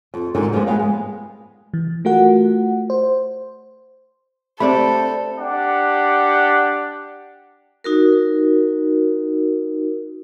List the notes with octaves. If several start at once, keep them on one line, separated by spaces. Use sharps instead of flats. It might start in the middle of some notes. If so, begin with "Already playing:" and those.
F2
G#2 D3 D#3 F#3
D#3 F3 G3 G#3 B3
G#3 B3 F5 G5
G#3
E3
A3 F4 F#4 A#4 F#5
C5
A3 C4 D4 G4 A4 C5 D5 B5
D4 G4 F#5
D#4 F#4 A#4